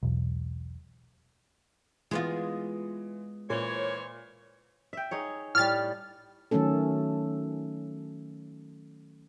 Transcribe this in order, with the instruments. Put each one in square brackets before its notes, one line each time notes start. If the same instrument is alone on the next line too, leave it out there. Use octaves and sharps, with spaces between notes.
[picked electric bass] E1 B1
[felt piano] E3 [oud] G#3 B3 F4
[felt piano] A#2 [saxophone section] E3 C5 C#5
[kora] E5 G5
D#4 G#4 C#5
[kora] A2 G3 [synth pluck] F6 A6
[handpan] D#3 F#3 A3 C#4 A4